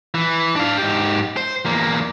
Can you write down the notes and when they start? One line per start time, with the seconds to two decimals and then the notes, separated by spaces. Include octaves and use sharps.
0.14 E3
0.56 D4 F5
0.78 G#2 G4
1.37 C5
1.66 E2 A#3